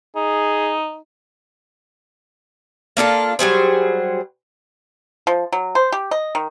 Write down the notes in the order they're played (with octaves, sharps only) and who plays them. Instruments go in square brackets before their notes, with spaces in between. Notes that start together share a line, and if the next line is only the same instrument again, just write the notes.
[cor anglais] D#4 [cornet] G#4
[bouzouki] A#3 D4 F4 A4
F#3 G3 G#4 C5
[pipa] F3
F#3
C5
G4
D#5
D#3